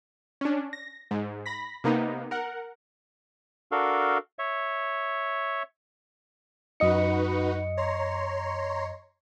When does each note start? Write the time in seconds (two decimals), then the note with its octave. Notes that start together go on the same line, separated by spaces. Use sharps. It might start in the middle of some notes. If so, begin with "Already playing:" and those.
0.41 C#4 D4
0.73 A#6
1.11 G#2
1.46 B5 A#6 B6
1.84 C3 A#3 B3 D#4
2.31 A#4 F#5
3.72 D4 F#4 A4 A#4 F5
4.39 C#5 E5
6.80 F#2 D#4 F#4 B4 D#5 C#7
7.77 C#5 A#5 C6